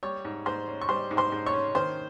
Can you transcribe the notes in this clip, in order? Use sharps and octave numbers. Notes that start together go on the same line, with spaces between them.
G3 C#5 C#6
G#2
G#2 C5 C6
C#4
C#6
G3 C5 C6
G#2
C5 C6
G#2
C#5 C#6
C#4
D#3 C5 C6